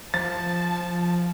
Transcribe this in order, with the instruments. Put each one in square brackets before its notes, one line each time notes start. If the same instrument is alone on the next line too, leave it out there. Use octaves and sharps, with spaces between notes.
[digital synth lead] F3 [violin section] A5 [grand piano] A6